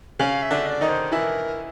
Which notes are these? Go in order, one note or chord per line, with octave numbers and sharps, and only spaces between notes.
C#3 C#4 F5
E5
D3 D4
D#5
D5
D#3 D#4
C5
E3 E4 A#4 B4